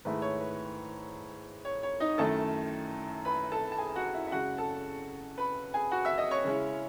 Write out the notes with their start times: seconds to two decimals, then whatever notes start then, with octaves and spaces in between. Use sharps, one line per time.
0.05 G#2 D#3 A3 E4 B4
0.22 C#5
0.41 B4
1.65 C#5
1.83 C#5
2.00 D#4 D#5
2.18 F#2 D#3 A3 E4 A4 A5
3.25 B4 B5
3.52 A4 A5
3.72 A5
3.78 G#4 G#5
3.96 F#4 F#5
4.14 E4 E5
4.27 E5
4.31 F#2 C#3 G#3 F#4 F#5
4.58 A4 A5
5.38 B4 B5
5.74 G#4 G#5
5.91 F#4 F#5
6.05 E5 E6
6.18 D#5 D#6
6.31 C#5 C#6
6.44 C#3 G#3 C#4 E4